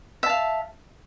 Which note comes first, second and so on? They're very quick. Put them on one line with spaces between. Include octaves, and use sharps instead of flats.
E5 A5 F5